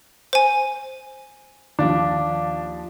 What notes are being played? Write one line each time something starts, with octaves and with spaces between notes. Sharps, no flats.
C5 G#5
D#2 F3 D4 F5 D6